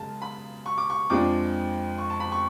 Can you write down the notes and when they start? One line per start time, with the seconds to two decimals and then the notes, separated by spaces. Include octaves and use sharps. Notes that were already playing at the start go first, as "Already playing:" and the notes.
Already playing: F#2 C#3 G#3 A5
0.22 B5
0.66 C#6
0.78 D6
0.90 C#6
1.10 F2 F3 G#3 D4 D6
1.98 C#6
2.10 A5
2.20 B5
2.32 C#6